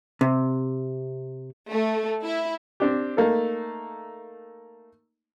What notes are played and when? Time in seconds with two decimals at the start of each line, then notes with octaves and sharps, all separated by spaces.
0.21 C3
1.71 A3
2.23 E4
2.80 C4 D4 G4
3.17 A3 A#3 D#4 A4